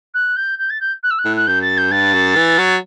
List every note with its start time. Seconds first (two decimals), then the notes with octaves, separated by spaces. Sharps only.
0.14 F#6
0.36 G6
0.58 G6
0.70 A6
0.80 G6
1.03 F#6
1.10 E6
1.18 F#6
1.25 A2
1.36 F#6
1.47 F#2 G6
1.61 A6
1.77 G6
1.91 G2 A6
2.14 F#2
2.36 E3
2.58 F#3